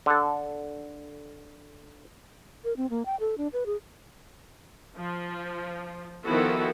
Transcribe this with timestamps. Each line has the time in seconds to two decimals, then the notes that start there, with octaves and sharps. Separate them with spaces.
0.06 D3 A4
2.65 A#4
2.77 C4
2.90 A#3
3.06 G5
3.20 A4
3.38 D4
3.53 B4
3.66 G#4
4.96 F3
6.24 D#3 F3 B3 E4 F#4 A4